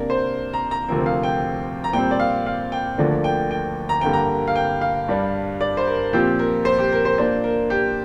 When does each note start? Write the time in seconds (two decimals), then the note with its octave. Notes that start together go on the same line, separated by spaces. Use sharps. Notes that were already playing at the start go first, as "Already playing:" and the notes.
Already playing: C3 A#3 D4 A#4
0.10 C5
0.53 A#5
0.71 A#5
0.89 D2 C3 F3 C4 A#4
1.06 F5
1.23 G5
1.84 A#5
1.93 A#2 G3 C4 G5
2.11 D5
2.20 F5
2.46 F5
2.72 G5
2.98 D2 D3 F3 A#3 D4
3.24 G5
3.51 G5
3.89 A#5
4.01 G2 D3 A#3 G5
4.13 A#5
4.48 F5
4.56 G5
4.81 F5
5.08 G2 G3 D4
5.61 D5
5.77 C5
5.87 A#4
6.13 A#2 F3 C4 G4
6.39 A#4
6.65 C5
6.79 G4
6.92 A#4
7.05 C5
7.18 A#2 A#3 D4 C5
7.44 A#4
7.70 G4